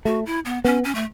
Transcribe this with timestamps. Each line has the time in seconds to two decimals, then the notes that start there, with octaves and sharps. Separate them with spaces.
0.05 A3 F#4
0.26 E4
0.45 B3
0.65 B3 C#4
0.84 C#4
0.95 A3